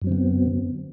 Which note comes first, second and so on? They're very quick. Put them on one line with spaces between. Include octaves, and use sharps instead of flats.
F#2 F#3 C4 D3 B3